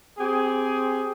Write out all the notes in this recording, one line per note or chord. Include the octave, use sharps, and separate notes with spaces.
C4 G4 G#4